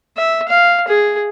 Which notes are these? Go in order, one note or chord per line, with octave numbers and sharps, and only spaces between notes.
E5
F5
G#4